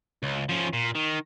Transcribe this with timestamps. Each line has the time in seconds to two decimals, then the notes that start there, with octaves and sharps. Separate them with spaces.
0.23 C#2
0.49 F3 C#4
0.73 A#2
0.95 D#3